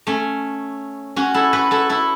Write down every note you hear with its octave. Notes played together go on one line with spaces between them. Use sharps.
A3 C#4
C#4 F#4
E4 A4
F#4 B4
E4 A4
E4 A4